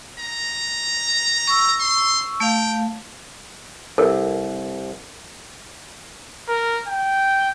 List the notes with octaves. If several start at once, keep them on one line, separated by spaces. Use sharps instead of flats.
A#5
C#6 E6
C6
A3 F5 G5
C2 A4 A#4
A#4
G5